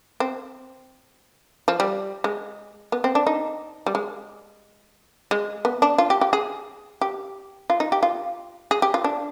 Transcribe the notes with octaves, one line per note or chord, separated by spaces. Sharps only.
C4
F3
G3
G#3
B3
C4
D4
D#4
G3
G#3
G#3
B3
D4
F4
G4
G4
G#4
G4
F4
D#4
G4
F4
G#4
G4
F4
D4